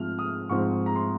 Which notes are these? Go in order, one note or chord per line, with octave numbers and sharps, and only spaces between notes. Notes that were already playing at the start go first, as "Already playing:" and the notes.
Already playing: G#2 F3 C4 F6
D#6
G#2 F3 C4 C#6
A#5
C6